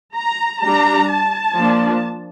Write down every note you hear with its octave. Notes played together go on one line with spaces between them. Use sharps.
A#5
G3 D4 A#5
A5
F3 A#3 D4